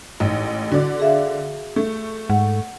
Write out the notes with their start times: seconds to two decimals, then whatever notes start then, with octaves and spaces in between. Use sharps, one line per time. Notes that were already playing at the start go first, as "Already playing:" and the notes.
0.20 A1 G#2
0.72 D3 F#4 D5
1.00 G#4 E5 F5
1.76 A3
2.30 G#2 F#5